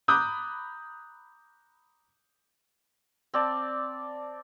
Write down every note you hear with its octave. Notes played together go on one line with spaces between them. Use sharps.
A#5 B5 D6 D#6 F#6 G6
C4 D5 A5